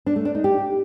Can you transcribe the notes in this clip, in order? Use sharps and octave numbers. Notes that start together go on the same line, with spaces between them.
D4
A3
D4
D#4
G4